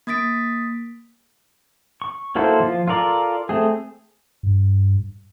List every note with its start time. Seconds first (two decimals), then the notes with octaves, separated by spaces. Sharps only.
0.07 A#3 D#6 A6 B6 D7
2.02 C#6
2.35 F#3 A#3 E4 A4 C5
2.60 F3 F4
2.88 F4 A4 A#4 D5
3.49 A3 C4 G#4
4.43 G2